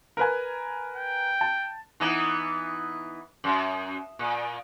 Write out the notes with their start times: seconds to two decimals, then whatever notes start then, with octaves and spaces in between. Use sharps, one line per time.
0.17 A#4 B4 G#5
0.96 G5
1.41 A5
2.00 E3 B3 D#4
3.44 F#2
4.19 A#2